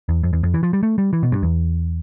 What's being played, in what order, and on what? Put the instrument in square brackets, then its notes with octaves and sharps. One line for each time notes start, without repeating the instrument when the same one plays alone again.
[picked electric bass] E2
F2
E2
F2
E3
F3
G3
A3
G3
E3
B2
G2
E2